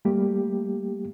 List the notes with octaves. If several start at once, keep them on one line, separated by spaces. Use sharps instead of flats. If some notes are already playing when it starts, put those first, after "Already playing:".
G3 A3 A#3 G4